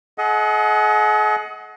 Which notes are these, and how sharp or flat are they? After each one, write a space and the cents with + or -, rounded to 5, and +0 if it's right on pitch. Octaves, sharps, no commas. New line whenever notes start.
G#4 +45 D#5 +25 F#5 +0